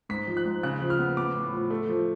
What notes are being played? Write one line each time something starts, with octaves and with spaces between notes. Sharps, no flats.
G#2 B6
F3
F#6
G#2
C#3 F#6
F3
F6
B3
B3 D6
A2
F3
A3
F3